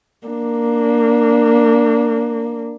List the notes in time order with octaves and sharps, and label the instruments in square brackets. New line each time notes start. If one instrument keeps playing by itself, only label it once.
[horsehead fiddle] A#3 D4